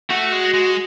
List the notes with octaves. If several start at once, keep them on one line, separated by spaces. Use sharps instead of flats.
A3 F#4
G#3
G#3